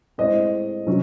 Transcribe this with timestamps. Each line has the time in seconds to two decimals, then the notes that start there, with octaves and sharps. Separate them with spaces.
0.18 A2 G#3 C4 D#5
0.87 C3 F#3 C#4